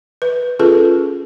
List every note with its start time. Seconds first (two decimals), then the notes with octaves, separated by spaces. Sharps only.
0.22 B4
0.59 C#4 F4 G#4 A4 B4